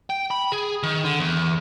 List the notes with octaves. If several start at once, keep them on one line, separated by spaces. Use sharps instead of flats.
G5
B5
G#4
D#3
D3
E2